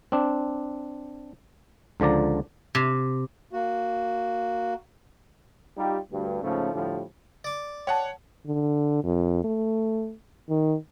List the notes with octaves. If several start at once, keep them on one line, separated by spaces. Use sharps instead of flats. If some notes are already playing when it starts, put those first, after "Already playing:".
C4 D4
C#2 D3 F3 D5 A#5
C3
A#3 F#4
G3 D#4 F4 G4
D2 G2
G#2 C#3 F3 A3 C#4
A2 D3 F3 G3
D5 D6
C#5 F#5 G5 A5
D3
F2
A3
D#3